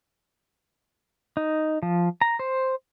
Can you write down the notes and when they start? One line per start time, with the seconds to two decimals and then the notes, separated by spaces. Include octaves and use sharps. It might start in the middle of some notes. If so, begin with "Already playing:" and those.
1.37 D#4
1.83 F3
2.21 A#5
2.39 C5